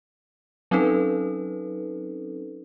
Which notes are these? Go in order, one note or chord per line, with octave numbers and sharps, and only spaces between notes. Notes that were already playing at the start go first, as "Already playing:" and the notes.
F#3 C4 C#4 D#4 A4 B4